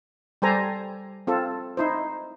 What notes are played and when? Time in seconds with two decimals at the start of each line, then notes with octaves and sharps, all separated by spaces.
0.42 G3 G4 A4 C5 G#5 A#5
1.27 C4 F4 A4
1.77 D#4 E4 C5